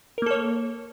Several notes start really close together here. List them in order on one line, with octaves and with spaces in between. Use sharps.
A#4 A#3 A4 C#5